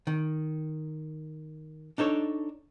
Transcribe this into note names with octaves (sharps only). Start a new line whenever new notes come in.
D#3
D4 D#4 A4 C#5